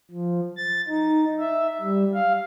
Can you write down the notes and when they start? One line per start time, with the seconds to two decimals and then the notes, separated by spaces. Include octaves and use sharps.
0.11 F3
0.57 A6
0.88 D#4
1.39 E5
1.81 G3
2.14 F5